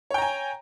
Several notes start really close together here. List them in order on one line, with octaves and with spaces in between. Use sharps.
C#5 G5 A#5 G#5